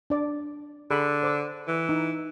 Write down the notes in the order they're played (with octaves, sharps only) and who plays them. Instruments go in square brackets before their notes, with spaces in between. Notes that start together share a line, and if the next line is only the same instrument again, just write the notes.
[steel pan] D4 D5 D6
[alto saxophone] D3 [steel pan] G#4 B5
[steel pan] C5 D6 E6
[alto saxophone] E3
[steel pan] D#4